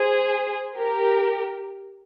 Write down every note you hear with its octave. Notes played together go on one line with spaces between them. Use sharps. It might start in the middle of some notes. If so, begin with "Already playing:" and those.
Already playing: G#4 C5
G4 A#4